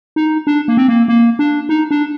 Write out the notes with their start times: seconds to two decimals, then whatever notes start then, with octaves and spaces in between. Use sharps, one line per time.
0.16 D#4
0.47 D4
0.68 A#3
0.77 C4
0.88 A#3
1.08 A#3
1.39 D4
1.69 D#4
1.91 D4